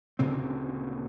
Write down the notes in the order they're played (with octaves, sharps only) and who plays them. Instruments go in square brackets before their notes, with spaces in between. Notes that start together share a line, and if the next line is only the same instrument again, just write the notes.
[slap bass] D2 A#2 C#3 C4